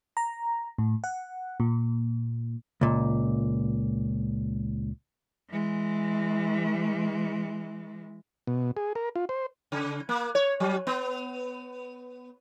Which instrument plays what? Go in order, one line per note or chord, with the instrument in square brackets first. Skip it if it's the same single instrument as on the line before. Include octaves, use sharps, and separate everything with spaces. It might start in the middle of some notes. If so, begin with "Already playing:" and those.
[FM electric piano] A#5
A2
F#5
A#2
[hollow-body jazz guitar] C#2 A#2
[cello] E3 G#3
[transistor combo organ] B2
G#4
A#4
F4
C5
[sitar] C#3
A#3
C#5
F#3
B3